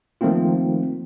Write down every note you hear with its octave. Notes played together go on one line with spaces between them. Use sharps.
D#3 F3 A3 A#3 C4 F4